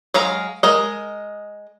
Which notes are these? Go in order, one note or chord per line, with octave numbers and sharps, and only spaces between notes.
F#3 G#3 F5 A#5
G#3 A#4 D#5